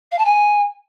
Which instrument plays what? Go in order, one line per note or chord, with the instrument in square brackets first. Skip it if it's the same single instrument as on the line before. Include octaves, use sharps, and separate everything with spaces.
[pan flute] F5
A5
G#5